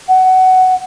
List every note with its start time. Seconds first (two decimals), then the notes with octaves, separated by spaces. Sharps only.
0.08 F#5